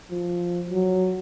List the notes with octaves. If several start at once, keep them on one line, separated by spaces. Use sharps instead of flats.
F3
F#3